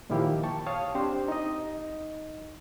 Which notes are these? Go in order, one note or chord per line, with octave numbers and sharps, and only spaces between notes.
A#2 D#3 F3 A#3 E4 G4
G5 A5 C#6
C#5 F5 A5 D#6
C4 D4 G4 C5
D#4 D#5